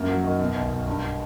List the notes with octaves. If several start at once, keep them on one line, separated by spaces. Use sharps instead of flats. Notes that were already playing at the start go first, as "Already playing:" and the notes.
Already playing: F#2 A#3
F#3
D#3
B2
B1
B1
G2